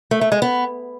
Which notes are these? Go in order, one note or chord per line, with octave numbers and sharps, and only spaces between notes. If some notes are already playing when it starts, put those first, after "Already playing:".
A3
A3
G#3
B3